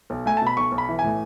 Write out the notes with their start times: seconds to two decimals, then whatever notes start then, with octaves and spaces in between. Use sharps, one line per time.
0.10 B1
0.26 A3 G#5
0.37 B2 A5
0.47 B5
0.57 B1 C#6
0.72 B1
0.78 B5
0.89 E3
0.99 G#5
1.04 A2